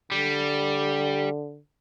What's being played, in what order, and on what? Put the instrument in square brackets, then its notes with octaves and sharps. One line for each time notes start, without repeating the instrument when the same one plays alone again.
[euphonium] D3 [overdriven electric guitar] G3